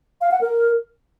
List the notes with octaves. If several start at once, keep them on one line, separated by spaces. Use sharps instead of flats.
F5
F#5
A#4